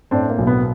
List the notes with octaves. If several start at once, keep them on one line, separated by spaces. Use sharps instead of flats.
A2 C4 D4
A#3
B1
B3